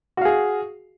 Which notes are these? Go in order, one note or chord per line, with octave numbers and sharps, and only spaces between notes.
F#4 G#4 F5